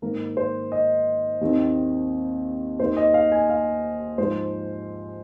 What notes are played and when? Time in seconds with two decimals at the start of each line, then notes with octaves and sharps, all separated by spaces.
0.02 G#2 D#3 A#3 A#4
0.37 C5
0.72 D#5
1.41 D#2 D#3 C4
2.79 D#2 D#3 A#3 C5
2.97 D#5
3.14 F5
3.32 G#5
3.50 F5
4.18 G#2 F3 G#3 C5